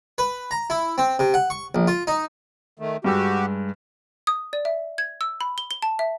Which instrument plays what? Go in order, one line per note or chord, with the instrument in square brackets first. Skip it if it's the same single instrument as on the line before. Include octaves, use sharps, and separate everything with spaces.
[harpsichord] B4
A#5
E4
C4
C3
F#5
C#6
A#1
F4
D#4
[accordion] D#3 A3
[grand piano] G2 G#3 E6 [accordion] F#4 G4
[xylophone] D#6
D5
E5
G#6
E6
B5
G7
G7
A5
E5